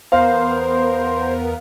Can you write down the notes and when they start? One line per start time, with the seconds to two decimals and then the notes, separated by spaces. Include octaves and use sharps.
0.12 E2 B3 A#4 C5 F5